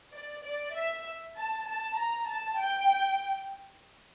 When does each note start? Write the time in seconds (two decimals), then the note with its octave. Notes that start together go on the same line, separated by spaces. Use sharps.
0.15 D5
0.45 D5
0.76 E5
1.37 A5
1.67 A5
1.98 A#5
2.28 A5
2.59 G5